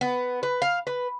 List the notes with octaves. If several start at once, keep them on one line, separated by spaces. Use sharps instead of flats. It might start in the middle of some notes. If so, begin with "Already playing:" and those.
B3
B4
F5
B4